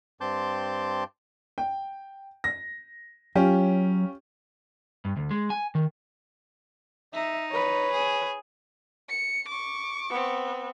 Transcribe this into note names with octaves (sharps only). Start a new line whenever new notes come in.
G2 C4 A5 C6 D6 G6
G5
A#6
F#3 C#4 F4 G4
G2
D2
G#3
G#5
D#3
D#4 E5
B4 C#5
G#4
C#7
C#6 D6
B3 C4